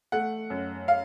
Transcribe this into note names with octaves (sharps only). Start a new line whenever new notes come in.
A3 F#5
F#2
F5